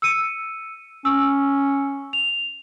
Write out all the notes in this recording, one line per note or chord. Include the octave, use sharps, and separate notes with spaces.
E6 C#7 D#7
C#4 E6
F7